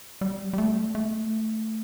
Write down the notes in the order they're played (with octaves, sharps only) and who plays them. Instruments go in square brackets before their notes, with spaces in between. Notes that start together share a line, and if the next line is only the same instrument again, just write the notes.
[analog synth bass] G3
G3
A3
A3